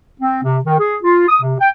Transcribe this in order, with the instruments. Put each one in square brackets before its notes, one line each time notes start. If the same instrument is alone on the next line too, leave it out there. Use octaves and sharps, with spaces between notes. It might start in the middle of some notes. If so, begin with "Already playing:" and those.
[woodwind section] C4
C3
D#3
G#4
F4
D#6
C3
G5